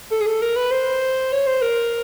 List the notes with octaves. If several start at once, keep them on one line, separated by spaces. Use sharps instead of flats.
A4
G#4
A4
A#4
B4
C5
C#5
C5
A#4